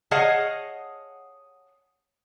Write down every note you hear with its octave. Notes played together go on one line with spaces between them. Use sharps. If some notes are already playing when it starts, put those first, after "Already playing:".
G#4 C#5 D#5 F5 F#5 A5